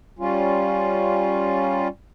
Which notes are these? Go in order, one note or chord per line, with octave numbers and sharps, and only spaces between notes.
G3 C#4 F4